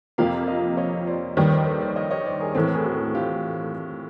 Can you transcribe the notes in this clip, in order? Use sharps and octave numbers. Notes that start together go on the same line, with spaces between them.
F2 C3 F3 A#3 F5 G5
D#5 F5
C#5 D#5
C5 D5
D#2 D#3 G3 B4 C#5
A#4 C5
A4 B4
C5 D5
C#5 D#5
C#5 D#5
C5 D5
G#4 A#4
A2 E3 A3 C4 A#4
B4
G#4 A#4
F#4
F4 G4